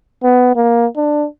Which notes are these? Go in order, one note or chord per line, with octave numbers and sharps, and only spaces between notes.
B3
A#3
D4